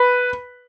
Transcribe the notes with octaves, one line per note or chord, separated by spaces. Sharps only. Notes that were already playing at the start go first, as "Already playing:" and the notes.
Already playing: B4